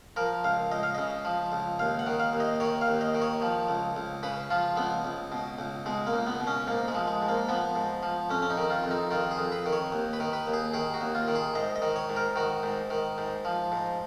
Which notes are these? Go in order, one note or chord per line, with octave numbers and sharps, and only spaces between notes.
F3 A#4
C#2 F5
C#2 D#5
F5
C#3 D#5
F3
C#2
D#2 F5
F#5
D#3
F5
D#2
D#5
D#3 C#5
F5
D#2
D#5
D#3
C#5
F3
C#2
C#2
C#3 B4
F3 F4
C#2 B3
C#2
B2
C#2
B2 G#3
A#3
C#2
B3
B2
C#4
G#2 A#3
G#3
F3
G#3
G#2
A#3
F3 B3
G#2
F3
F2 C#4
C#4
D#4
D#3
F4
F2
D#4
D#3 F4
G#4
F2
B4
D#3
C#5
D#2
B4
D#3
B4
D#2
G#4
D#3 G#4
F#4
D#2
F4
D#3
G#4
G#2 D#5
D#5
D#3
C#5
G#2
A#4
D#3 F#4
G#2
D#3
G#2
F3
G#2